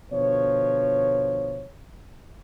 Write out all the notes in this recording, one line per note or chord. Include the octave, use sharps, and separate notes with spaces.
B2 D3 F3 C#5